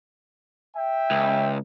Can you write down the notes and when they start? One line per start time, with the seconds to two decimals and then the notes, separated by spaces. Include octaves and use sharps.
0.76 E5 G5
1.11 C#2